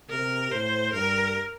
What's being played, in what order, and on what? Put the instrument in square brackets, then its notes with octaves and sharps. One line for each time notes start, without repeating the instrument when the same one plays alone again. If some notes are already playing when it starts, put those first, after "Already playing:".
[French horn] C3 [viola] A#4
[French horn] A2 [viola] C5
[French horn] G2 [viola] A#4